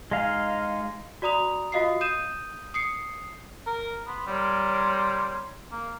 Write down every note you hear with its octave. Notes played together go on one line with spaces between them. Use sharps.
G#3 D#4 F5
F#4 D5 A#5 D#6 F7
F4 F#4 D#5 F5 D#6 C7
D#6 G6 D#7 E7
D#6 C7 C#7
A#4
B3 B5 C6
G3 A#4 C#5 C6
A#3